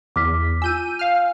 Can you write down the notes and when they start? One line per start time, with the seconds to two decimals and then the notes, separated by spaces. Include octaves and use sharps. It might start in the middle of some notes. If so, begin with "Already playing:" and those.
0.16 E2 D6 F6 B6
0.62 F4 G#5 E6 G6 D#7
0.99 F5 F6